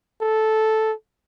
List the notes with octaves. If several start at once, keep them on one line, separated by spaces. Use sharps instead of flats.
A4